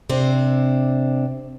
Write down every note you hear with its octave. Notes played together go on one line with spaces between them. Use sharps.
C3 C4 D4